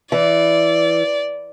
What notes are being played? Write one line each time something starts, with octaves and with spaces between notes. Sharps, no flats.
E3 D5